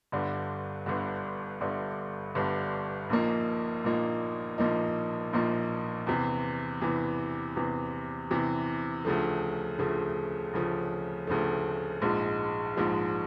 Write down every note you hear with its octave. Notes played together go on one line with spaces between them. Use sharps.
G1 G2 D3
G1 G2 D3
G1 G2 D3
G1 G2 D3
A#1 A#2 F3 A#3 D#4
A#1 A#2 F3 A#3 D#4
A#1 A#2 F3 A#3 D#4
A#1 A#2 F3 A#3 D#4
E2 C3 E3
E2 C3 E3
E2 C3 E3
E2 C3 E3
D2 C#3 F3 A3
D2 C#3 F3 A3
D2 C#3 F3 A3
D2 C#3 F3 A3
A#1 G#2 F3 G#3
A#1 G#2 F3 G#3